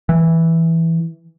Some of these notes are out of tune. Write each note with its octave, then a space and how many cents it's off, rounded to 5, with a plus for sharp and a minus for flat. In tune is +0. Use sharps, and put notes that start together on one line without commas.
E3 -5